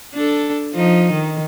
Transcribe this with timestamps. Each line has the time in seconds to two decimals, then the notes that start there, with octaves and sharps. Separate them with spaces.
0.14 D4 A4
0.74 F3 D#4
1.12 D#3